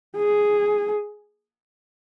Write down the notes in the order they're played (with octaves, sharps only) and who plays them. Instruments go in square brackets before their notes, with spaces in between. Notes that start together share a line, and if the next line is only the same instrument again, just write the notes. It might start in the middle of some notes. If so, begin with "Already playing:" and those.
[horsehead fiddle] G#4